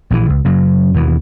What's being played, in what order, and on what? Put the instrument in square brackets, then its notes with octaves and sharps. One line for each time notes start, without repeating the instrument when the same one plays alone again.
[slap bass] A#1 D#3 E3
C#2
F#2 C#3 F#3
D#2 B2 E3